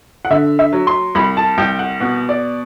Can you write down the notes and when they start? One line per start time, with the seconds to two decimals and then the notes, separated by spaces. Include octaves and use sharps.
0.25 F#5
0.30 D3 E5
0.59 E5
0.73 F#3
0.87 C6
1.15 C2 B5
1.37 A5
1.58 C2 G5
1.79 F#5
2.00 B2 F#5
2.29 D5